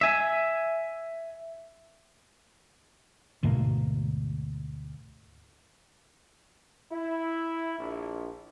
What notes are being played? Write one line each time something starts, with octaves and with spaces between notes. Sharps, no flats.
E5 G#5
D2 G#2 B2 A#3
E4
A#1